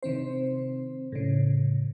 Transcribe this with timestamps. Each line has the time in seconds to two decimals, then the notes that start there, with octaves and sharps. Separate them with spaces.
0.03 C3 D#3 C4 C5
1.12 A2 C#3